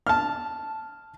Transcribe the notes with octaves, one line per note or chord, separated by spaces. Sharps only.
A5 F6